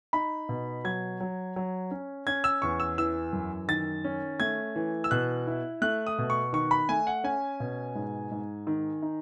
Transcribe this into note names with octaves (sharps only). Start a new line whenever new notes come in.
D#4 B5
B2
F#3 G#6
F#3
F#3
C#4
C#4 G#6
E6
E2 C#6
E6
E3 E6
F#2
D#3 A6
C#4
A3 G#6
E3
E6
B2 F#6
E4
A3 F#6
D#6
B2
C#6
D#3 C#6
B5
A3 G#5
F#5
C#4 G#5
B2
G#2
G#2
D#3
D#4